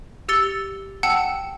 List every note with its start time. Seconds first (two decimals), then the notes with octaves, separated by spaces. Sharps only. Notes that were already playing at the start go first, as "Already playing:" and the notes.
0.29 G4 E6 A6 C#7 G7
1.03 F#5 G5 A5 E6 C#7